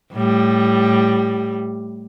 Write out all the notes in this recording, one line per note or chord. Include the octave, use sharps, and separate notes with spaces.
A2 G3